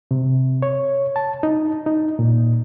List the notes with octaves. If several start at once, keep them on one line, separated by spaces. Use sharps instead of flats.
C3
C#5
A5
D#4
D#4
A#2